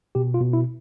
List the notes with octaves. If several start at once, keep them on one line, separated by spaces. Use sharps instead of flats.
B2 G4
F4
B2
E4